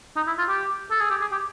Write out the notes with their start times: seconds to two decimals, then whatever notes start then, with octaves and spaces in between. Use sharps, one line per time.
0.17 D#4
0.27 E4
0.38 F4
0.49 G4
0.91 A4
1.01 G#4
1.10 G4
1.21 G#4
1.32 G4